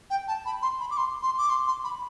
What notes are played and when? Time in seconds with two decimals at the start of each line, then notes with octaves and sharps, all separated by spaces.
0.10 G5
0.28 A5
0.45 B5
0.62 C6
0.80 B5
0.91 D6
0.97 C6
1.22 C6
1.38 D6
1.50 C6
1.67 C6
1.84 B5